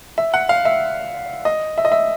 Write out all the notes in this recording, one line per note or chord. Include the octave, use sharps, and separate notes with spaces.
E5
F#5
F5
E5
D#5
E5
D#5
E5